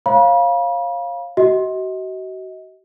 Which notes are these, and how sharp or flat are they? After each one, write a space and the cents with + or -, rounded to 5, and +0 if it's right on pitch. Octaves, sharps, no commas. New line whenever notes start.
C#5 -30 F5 +0 B5 -40
F#4 +35 D#5 +35